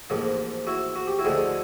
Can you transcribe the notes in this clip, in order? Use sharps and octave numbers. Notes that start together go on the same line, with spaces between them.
A1 G#2 F3 A#3
E4 F#4
F#4
G4
E4 F#4
D2 D3 F3 G#3